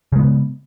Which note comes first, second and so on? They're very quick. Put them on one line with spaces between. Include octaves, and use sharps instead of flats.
C#3 G#3 B3